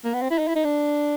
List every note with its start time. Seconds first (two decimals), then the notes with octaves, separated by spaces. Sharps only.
0.04 A#3
0.13 B3
0.21 C4
0.30 E4
0.38 D#4
0.47 E4
0.56 D#4
0.64 D4